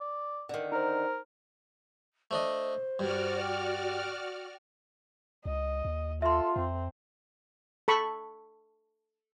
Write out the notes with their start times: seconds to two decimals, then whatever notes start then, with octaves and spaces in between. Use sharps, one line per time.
0.01 D5
0.49 D3 D#3
0.72 D#4 A#4 C5
2.31 A3 D4 C5 D#5
2.99 G2 F#4 D5 F6
3.42 G5
5.45 C#2 D#5
5.85 D#2
6.22 F4 A4 E5 C6
6.56 F2 C4
7.88 A4 B5 C#6